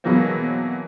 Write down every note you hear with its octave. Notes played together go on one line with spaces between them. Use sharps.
B2 E3 F#3 G#3 A#3 C4